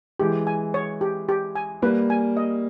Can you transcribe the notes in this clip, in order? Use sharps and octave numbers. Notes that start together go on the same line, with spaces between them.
E3 G#3 G4
G#5
C#5
G4
G4
G#5
G3 A#3 B4
G#5
D#5